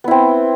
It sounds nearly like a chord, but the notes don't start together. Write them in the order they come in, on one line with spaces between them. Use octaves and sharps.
B3 E4 C4